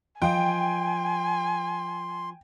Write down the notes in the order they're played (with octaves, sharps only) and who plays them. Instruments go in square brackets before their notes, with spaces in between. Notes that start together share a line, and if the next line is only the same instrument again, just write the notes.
[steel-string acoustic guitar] F3 D#5 [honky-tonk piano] G5 [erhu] G#5 [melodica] C6